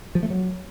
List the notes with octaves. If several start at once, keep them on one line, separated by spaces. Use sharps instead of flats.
F3
A3
F#3